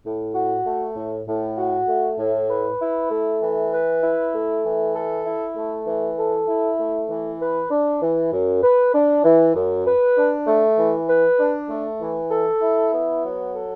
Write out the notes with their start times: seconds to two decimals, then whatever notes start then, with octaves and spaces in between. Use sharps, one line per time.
0.04 A2
0.35 F#4
0.65 A3
0.96 A2
1.27 A2
1.58 F#4
1.88 A3
2.19 A2
2.49 B4
2.80 E4
3.11 A3
3.41 E3
3.73 B4
4.03 E4
4.34 A3
4.64 E3
4.95 A4
5.26 E4
5.56 A3
5.87 E3
6.18 A4
6.48 E4
6.79 A3
7.10 E3
7.41 B4
7.71 D4
8.02 E3
8.32 F#2
8.63 B4
8.94 D4
9.24 E3
9.55 F#2
9.86 B4
10.16 D4
10.47 A3
10.78 E3
11.08 B4
11.39 D4
11.70 A3
12.01 E3
12.31 A4
12.61 E4
12.93 B3
13.23 F#3
13.54 A4